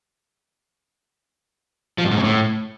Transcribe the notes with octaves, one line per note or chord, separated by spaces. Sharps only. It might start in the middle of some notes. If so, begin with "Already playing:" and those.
F3
G2
G#2
C#3
A2